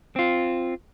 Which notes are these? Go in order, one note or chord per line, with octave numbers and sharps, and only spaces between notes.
C4 F4